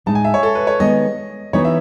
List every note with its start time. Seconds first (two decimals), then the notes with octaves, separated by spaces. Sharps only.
0.06 A2 G#3 D#4 A5
0.15 G#5
0.24 E5
0.34 C#5
0.43 A4
0.55 B4
0.67 C#5
0.80 D#3 G#3 B3 D#5
1.53 E3 B3 D#4 F#4 C#5
1.65 E5